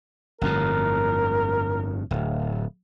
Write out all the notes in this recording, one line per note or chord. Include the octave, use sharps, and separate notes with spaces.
G1 F2 A2 A#4
D1